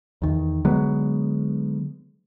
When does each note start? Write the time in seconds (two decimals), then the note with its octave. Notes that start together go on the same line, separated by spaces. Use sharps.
0.22 E2 D#3
0.65 D3 F#3 G#3 B3